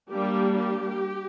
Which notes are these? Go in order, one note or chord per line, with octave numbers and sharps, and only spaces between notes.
G3 A#3 D4 G4
G4